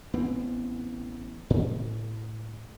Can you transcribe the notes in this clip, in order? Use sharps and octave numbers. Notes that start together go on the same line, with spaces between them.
A1 B3 C4
A2